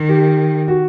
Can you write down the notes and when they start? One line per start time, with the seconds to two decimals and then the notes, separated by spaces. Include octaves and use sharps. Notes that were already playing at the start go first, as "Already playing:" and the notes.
Already playing: D#3
0.09 G4
0.68 F#4